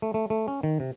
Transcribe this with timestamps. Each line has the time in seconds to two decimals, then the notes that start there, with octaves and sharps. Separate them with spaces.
0.02 A3
0.14 A3
0.30 A3
0.48 C#4
0.63 D#3
0.80 C3